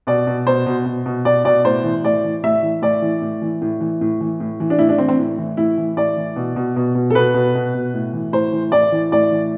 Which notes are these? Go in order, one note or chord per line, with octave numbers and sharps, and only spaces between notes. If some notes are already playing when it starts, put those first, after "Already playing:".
B2 D5
B2
B2 C5
B2
B2
B2
B2 D5
B2 D5
A2 C5
E3
A2 D5
E3
A2 E5
E3
A2 D5
E3
A2
E3
A2
E3
A2
E3
A2
E3
D4
A2 E4
D4
E3 C4
C4
A2
E3
A2 E4
E3
A2 D5
E3
B2
B2
B2
B2
A4
B2 B4
B2
B2
B2
A2
E3
A2 C5
E3
A2 D5
E3
A2 D5
E3